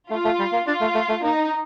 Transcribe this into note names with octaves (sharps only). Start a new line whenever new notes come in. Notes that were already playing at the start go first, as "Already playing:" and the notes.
A3 F4
A3
G3
A#3
D4 F4
A3
A3
A3
A#3 D#4